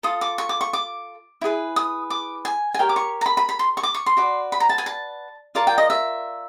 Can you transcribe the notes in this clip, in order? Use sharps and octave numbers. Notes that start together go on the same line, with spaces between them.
F4 A4 D#6
D6
C#6
D6
C#6
D6
E4 G#4 B4
D#6
D6
G#5
G#5
G4 A#4 C#5 G5
D6
C#6
A#5
B5
B5
B5
C6
C#6
D6
C#6
C6
F#4 B4 D5
B5
A#5
A5
G#5
A5
F4 A#4 D5 A5
G5
D#5
E5